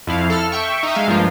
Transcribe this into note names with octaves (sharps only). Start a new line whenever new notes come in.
F2 E4 F5
A4 F6
E5 G5 C#6
D#4 E5
G#3 F5
G2 F3 A#3 F4